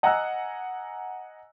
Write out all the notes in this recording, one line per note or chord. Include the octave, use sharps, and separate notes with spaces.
D#5 F#5 G#5 A#5 E6 F#6